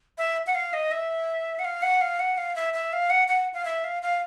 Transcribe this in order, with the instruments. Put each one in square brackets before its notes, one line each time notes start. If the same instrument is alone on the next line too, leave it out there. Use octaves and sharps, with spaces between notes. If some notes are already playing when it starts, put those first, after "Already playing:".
[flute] E5
F#5
F5
D#5
E5
F#5
F5
F#5
F5
F#5
F5
E5
E5
F5
F#5
F#5
F5
E5
F5
F5